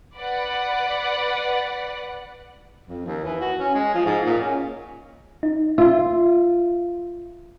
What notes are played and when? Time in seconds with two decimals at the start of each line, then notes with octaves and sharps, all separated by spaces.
0.16 B4 D5 F#5
2.87 F2
3.06 D#2
3.24 E3
3.41 F#4
3.59 C#4
3.75 G#3
3.95 F3
4.06 G#2
4.25 A#2
4.40 C#4
5.43 D#4
5.78 F4 E5